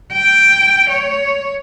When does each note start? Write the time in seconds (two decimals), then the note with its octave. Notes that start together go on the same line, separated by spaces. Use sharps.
0.13 G5
0.90 C#5